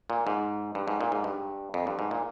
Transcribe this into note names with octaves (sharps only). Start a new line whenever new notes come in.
A#2
G#2
G2
G#2
A#2
G#2
G2
F2
G2
G#2
A#2